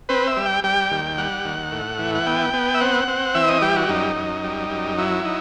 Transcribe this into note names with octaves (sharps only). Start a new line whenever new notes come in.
C4 B4
E5
G3
G5
G3 G5
D#2
G3 F#5
D#2
A2
E3
F#5
B3 G5
B3
E5
C4 F#5
C4
E3 E5
D#5
G3 G4
F#4
F#2 D#4
F#2
G3
F#2
F#3 E4
D#4